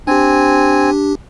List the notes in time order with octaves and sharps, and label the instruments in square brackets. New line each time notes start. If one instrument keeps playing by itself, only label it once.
[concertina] C4 G#5 [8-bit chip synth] D4 G4